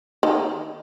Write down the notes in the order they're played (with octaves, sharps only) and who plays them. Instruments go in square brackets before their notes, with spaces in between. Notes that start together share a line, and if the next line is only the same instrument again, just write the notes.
[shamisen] D#3